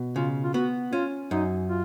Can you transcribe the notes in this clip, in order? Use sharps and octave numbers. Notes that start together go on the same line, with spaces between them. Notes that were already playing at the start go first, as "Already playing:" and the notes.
Already playing: B2
C#3 F4
F4
B3 F#4
C#4 F4
F#2 D#4
F4